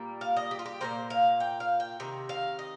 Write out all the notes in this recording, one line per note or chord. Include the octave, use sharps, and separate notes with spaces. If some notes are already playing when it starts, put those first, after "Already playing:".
Already playing: A#2 G3 A#3
F5
D#5
G4
F4
G4
A#2 G3 A#3 C5
F5
G5
F5
G5
C3 D#3
F5
D#5